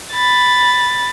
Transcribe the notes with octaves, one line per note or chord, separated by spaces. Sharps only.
B5 A6